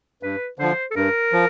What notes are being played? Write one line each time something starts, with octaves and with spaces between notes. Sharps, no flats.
G2 B4
D3 F3 C5
A4
G2 A#4
F3